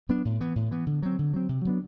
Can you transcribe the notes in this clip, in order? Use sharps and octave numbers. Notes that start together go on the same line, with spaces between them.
F#3 B3 D4
A2
E3 B3
A2
E3 B3
D3
F#3 C4
D3
F#3 C4
C3
F#3 B3 D4